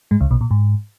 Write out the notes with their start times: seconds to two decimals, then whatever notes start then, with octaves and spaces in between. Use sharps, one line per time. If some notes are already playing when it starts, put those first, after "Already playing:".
0.11 G#2 G#3
0.20 C#2 C#3
0.31 B1 B2
0.41 A#2
0.51 G#2